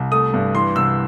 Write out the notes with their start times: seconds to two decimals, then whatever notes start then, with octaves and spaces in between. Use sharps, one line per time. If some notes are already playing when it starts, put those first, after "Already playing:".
Already playing: C2
0.11 A3 D#6
0.34 G2
0.54 E3 C6
0.76 C2 E6